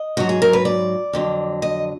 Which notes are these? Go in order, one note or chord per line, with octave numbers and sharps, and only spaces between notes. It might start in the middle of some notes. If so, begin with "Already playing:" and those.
Already playing: D#5
G#2 F#3 F#4
G#4
A#4
B4
D5
F2 D3 F#3
D#5